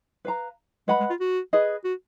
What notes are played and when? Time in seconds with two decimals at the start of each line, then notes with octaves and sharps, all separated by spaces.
0.25 B4 F5 A#5
0.88 G#3 B4 D#5 F#5 B5
1.00 G#3
1.10 F4
1.20 F#4
1.53 G#4 B4 D#5
1.84 F#4